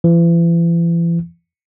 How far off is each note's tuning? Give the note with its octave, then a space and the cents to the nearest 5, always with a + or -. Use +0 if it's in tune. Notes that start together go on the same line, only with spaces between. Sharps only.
E3 +40